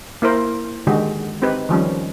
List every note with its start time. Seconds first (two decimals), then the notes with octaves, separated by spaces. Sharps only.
0.22 A#3 E4 A#4 C5
0.87 D3 D#3 G#3 F#4 G4
1.42 C4 D#4 G4 B4
1.69 D#3 F3 G3 C#4